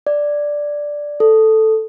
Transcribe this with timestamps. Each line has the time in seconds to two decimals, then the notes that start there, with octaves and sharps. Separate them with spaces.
0.07 D5
1.20 A4